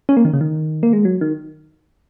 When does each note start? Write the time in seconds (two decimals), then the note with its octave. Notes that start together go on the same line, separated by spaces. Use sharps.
0.09 C#4
0.17 A#3
0.25 D#3
0.33 C#3
0.41 D#3
0.83 A#3
0.93 G#3
1.05 F#3
1.21 D#3